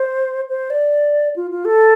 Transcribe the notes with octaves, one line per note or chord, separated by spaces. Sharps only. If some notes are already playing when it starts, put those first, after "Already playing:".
Already playing: C5
C5
D5
F4
F4
A4